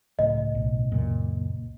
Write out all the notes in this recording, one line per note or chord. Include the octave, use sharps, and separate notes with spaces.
C#2 A2 D#5
B1
C#2 F#2 A#2